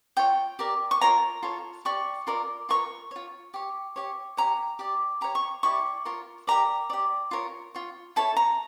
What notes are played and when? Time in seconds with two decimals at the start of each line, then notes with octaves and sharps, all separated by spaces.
0.17 F4 C#5 G5
0.59 G4 A#4 D5
0.91 C#6
1.01 F4 A#4 C#5 A#5
1.43 F4 A4 C#5
1.85 G4 D5 C#6
2.27 F4 A#4 D5
2.69 F4 A#4 C#5 C#6
3.11 F4 C#5
3.54 G4 C#5
3.96 G4 C#5
4.37 G4 C#5 A#5
4.79 G4 D5
5.21 G4 C#5 A#5
5.35 C#6
5.63 E4 G4 D5 C#6
6.05 F4 A#4 C#5
6.47 G4 A#4 D5 A#5
6.90 G4 D5
7.31 F4 A#4 C#5
7.74 F4 C#5
8.16 E4 A4 C#5 A5
8.37 A#5